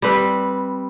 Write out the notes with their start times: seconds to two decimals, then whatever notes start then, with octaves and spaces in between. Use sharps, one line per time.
0.02 G3 C4 B4